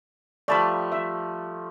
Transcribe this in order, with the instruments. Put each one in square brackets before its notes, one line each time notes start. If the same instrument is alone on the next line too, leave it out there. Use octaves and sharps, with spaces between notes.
[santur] F3 G3 A3 [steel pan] D5 A5 B5
[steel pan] E5